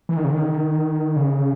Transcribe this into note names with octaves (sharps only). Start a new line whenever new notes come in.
E3
D#3
C#3
D#3
C#3